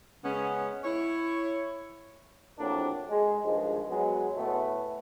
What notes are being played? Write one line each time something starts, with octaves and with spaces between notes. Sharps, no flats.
C#3 G#3 B3 C#4
E4 C#5
A#1 A2 F#3 A#3 C4 D4
G#3
G2 D#3 F3 G#3
F#3 G#3 B3
A2 A3 B3